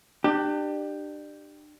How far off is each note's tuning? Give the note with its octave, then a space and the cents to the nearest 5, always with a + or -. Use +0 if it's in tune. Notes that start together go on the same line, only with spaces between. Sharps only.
D4 +35 G4 +0